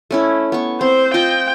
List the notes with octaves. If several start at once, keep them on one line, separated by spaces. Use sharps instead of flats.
A3 C#4 E4
B3 C#6
C4 C5
F4 C5 D#5 G5